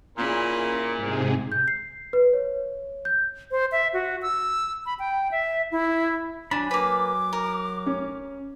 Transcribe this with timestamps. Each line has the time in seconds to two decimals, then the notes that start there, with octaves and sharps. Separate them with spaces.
0.17 A#2 C#4 E4 G#4
0.97 G#2 C3 G#3
1.52 G6
1.68 C7
2.13 B4
2.33 C#5
3.05 G6
3.51 C5
3.72 E5
3.93 F#4
4.22 E6
4.86 B5
4.99 G5
5.31 E5
5.72 E4
6.51 F#3 D4 G#5 B5
6.71 A#3 B4 D6
7.33 A#4
7.86 C#4